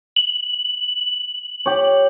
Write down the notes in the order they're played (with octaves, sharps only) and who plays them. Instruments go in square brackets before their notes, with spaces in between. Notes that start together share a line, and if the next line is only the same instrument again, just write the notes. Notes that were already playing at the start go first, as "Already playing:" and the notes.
[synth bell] F#7
[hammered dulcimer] G4 C#5